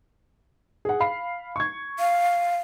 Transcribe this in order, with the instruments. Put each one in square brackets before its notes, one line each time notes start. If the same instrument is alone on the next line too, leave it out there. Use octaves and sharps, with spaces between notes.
[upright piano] G#4 F#5
F5 B5 C7
C#6 G#6
[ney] F5